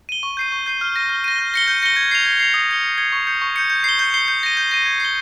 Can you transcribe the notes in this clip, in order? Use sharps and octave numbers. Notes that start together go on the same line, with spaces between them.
D#7 G7
C#6
G6 C7 D#7
C#6
G6 C7 D#7
F6
A#6 D#7
F6
A#6 D#7
G6
A#6 C#7 G7
G6
A#6 C#7 G7
G#6
C7 F7
G#6
C7 F7
D#6
G#6 C#7 G7
D#6
G#6 C#7 G7
C#6
G6 C#7
C#6
G6 C#7
G6
C7 G7
G6
C7 G7
G6
A#6 D#7
G6
A#6 D#7
G#6
C7 G7